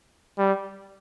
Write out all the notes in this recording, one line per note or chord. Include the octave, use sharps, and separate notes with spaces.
G3